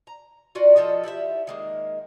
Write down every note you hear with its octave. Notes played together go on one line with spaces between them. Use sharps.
A#5
D4 F4 F#4 D5
F3 F4 A4 D#5
E4 G4 B4 E5
D#3 G#3 A#3